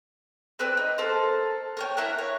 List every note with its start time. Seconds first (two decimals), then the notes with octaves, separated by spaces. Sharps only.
0.59 C4 B4 D5 E6
0.77 D#4
0.98 A4 A#4 C5
1.77 A#4 C#5 G5
1.97 E4 A#4 E5 F#5
2.18 C#5